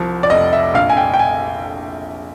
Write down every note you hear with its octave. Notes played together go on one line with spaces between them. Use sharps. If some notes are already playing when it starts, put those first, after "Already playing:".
Already playing: C2 F3
D5
F1 D#5
E5
A#1 F5
G#5
G5
G5
G#5